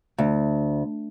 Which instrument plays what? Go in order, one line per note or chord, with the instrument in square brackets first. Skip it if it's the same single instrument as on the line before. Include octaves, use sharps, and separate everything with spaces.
[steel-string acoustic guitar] D2